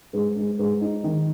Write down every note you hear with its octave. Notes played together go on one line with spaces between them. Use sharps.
G#2
G#2
G#2
D#4
D#3